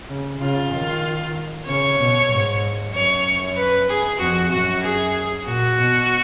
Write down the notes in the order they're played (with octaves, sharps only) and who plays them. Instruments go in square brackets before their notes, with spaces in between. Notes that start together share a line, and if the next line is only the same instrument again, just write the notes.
[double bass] C#3
[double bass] C#3 [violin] F4
[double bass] D#3
[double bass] C#3 [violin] C#5
[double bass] B2
G#2
[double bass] F#2 [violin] C#5
[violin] B4
G#4
[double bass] F2 [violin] F#4
[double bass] F#2 [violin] F#4
[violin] G#4
[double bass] A#2 [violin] F#4
[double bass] B2